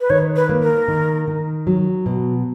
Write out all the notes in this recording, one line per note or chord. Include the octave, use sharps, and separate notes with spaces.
B4
D#3 C#5
B4
A#3
A#4
D#3
D#3
F#3
B2